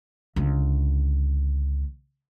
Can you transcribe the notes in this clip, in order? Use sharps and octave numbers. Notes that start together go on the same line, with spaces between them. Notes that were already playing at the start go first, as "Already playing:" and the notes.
C#2 D3